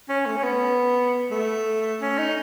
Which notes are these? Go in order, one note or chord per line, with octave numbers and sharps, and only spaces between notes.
C#4
A3
C#4
B3
A3
C#4
D#4